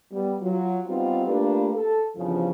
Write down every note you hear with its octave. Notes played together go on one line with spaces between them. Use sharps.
G3 B3
F#3 F4
G3 B3 C4 D#4 F4
A3 A#3 D4 F4 G4 B4
A4
E2 G2 C#3 F3